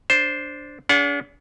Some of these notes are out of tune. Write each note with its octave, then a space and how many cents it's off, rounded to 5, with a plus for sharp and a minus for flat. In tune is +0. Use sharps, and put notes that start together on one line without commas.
D4 -10 C5 +0
D4 -45 G#4 +0 F#5 -35